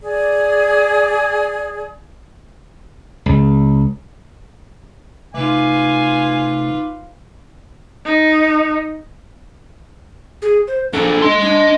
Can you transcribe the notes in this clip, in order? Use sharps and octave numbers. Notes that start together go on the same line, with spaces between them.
G#4 D5
C#2
C3 A3 D#4 F4 B4 G#5 D6
D#4
G#4
C5
F3 D4 A4
D#5 C6
D4